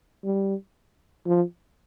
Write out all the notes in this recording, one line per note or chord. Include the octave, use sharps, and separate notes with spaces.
G3
F3